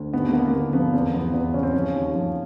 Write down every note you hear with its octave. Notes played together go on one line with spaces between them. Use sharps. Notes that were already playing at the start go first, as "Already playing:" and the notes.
Already playing: D2
D#2 B3
A#3
D#2 B3
A#3
D3 B3
F3 B3
E2 C4
F3 B3
E2 B3
C#3 C#4
C4
F3 C#4
D#2
F3